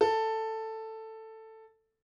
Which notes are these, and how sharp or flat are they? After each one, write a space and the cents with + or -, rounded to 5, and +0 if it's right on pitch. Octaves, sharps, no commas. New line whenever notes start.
A4 +10